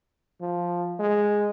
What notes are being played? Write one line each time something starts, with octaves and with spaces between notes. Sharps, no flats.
F3
G#3